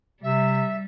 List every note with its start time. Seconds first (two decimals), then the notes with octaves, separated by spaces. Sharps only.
0.23 C3 G3 E5